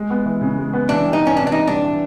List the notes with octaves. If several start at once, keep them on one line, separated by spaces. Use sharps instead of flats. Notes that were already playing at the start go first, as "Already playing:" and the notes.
Already playing: G#3
B3
E3
C#3
G#3
B3
E3 D4
G3
D#4
G2
C#4
G#1 D4
D4
E3 D#4
G3 D4
E3